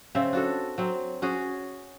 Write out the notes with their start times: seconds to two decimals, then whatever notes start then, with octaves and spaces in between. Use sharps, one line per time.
0.15 C#3 C4 E5
0.33 D4 F#4 A4
0.78 F#3 C4
1.22 C#4 F#4 G#4